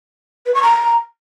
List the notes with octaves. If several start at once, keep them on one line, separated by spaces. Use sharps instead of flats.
B4
C#6
A#5